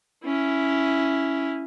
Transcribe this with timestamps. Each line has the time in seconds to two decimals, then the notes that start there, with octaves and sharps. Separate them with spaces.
0.24 C#4 E4